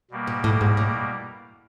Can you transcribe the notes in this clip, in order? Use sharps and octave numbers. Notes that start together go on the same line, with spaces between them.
B2 G3 A#3
A#2
A2
G#2
A2